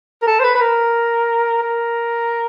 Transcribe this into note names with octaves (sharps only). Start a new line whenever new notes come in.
A#4
A4
C5
B4
B4
A#4
A#4